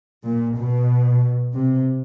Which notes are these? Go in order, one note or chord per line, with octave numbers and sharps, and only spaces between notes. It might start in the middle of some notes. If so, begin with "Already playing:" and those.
A#2
B2
C3